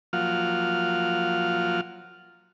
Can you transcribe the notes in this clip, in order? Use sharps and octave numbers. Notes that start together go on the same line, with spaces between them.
F3 F#3 A#3 F4 F#5 F6